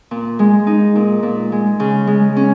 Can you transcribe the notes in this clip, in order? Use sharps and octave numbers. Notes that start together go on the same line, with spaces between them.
A#2
G#3
D#4
A#2
A#2
G#3
C#3
G#3
C#4